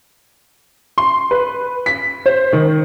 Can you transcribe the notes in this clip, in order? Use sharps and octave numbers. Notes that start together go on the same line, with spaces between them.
C6
B4
B6
C5
D#3